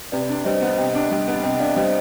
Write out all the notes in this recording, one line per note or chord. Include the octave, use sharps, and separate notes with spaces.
C3 B4 D5
D4
G3 C5 D#5
B3
C3 D#5 G5
D4
G3
B3
C3 D#5 G5
D4 D5 F5
G3 C5 D#5